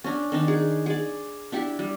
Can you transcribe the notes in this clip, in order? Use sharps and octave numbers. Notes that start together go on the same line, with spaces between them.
C#4 D4
D#3 D4 D#4
G#4
G#4 D5
D4 E4 G4
G3